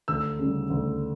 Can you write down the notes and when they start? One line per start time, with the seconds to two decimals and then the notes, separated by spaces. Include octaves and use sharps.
0.08 D2 E6
0.39 C#3 G3
0.70 D2